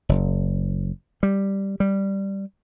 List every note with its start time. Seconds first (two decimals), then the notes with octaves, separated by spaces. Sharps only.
0.09 F#1
1.23 G3
1.80 G3